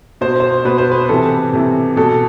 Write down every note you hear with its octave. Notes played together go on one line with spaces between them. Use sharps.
B2 C5
C5
B2 B4
C5
B4
C3 E3 A4
C3 E3
B2 A4